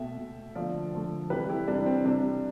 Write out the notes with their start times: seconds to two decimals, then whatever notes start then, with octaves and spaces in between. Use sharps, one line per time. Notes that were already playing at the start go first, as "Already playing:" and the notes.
Already playing: B2 A3 E5 G5
0.18 B2 A3
0.55 D3 F3 A3 D5 F5
0.93 D3 F3 A3
1.30 C3 E3 G3 G4 B4
1.49 E4 G4
1.67 C3 E3 G3 D4
1.86 C4
2.05 C3 G3 D4